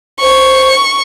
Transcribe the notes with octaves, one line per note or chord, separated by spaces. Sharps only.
C5 C#6